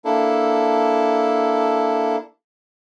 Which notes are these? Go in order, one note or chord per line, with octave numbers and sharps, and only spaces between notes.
A#3 D4 E4 A4